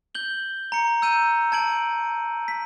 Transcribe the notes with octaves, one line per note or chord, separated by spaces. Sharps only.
G6 F#7 G7
A#5 C#7
E6 G6 D#7
A5 G#6 D7 F#7
B6